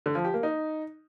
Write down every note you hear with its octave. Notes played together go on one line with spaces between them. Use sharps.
D3
F3
G4
A#3
D#4